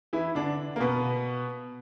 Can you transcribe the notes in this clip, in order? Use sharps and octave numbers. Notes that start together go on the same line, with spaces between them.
E3 E4
D3 D4
A#3
B2 B3